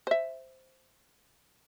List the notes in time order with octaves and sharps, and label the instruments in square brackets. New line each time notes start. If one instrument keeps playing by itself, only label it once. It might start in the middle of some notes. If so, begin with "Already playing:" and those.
[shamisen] C5 E5